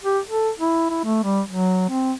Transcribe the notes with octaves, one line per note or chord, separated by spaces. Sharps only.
G4
A4
E4
E4
A3
G3
F#3
C4